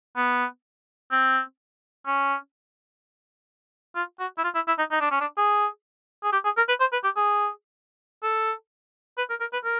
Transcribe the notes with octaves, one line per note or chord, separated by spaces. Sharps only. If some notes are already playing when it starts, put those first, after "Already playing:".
B3
C4
C#4
F4
F#4
E4
F4
E4
E4
D#4
D#4
D4
C#4
D4
G#4
G#4
G4
G#4
A#4
B4
C5
B4
G4
G#4
A4
B4
A#4
A#4
B4
A#4